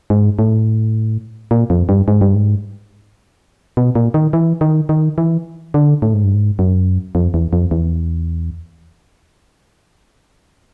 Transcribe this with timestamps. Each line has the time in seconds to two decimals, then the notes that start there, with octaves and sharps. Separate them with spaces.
0.10 G#2
0.39 A2
1.51 A#2
1.70 F2
1.89 G2
2.08 G#2
2.21 G2
2.35 G#2
3.77 B2
3.95 A#2
4.14 D#3
4.33 E3
4.61 D#3
4.89 D#3
5.18 E3
5.74 D3
6.02 A2
6.14 G#2
6.24 G2
6.34 G#2
6.59 F#2
7.15 F2
7.34 E2
7.53 F2
7.71 E2